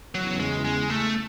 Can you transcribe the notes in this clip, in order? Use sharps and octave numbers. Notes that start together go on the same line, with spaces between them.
E2 C#3 E3 F#3 B3 E4
G#3
G#3
A3